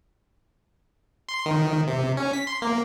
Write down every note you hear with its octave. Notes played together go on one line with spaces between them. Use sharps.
C6
D#3
C3
C#4
B6
C6
A#3